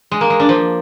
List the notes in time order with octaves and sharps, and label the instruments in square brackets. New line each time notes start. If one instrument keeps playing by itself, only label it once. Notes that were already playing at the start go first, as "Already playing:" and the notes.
[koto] G#3
A#3
G#3
D4
F3